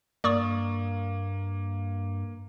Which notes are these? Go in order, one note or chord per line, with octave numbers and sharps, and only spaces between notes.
G2 A#3 D5 C#6 D#6